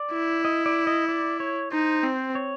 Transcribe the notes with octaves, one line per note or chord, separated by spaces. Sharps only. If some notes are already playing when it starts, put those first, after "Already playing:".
Already playing: D5
E4
D#5
D5
D#5
D5
C#5
D#4 C5
C4
C#5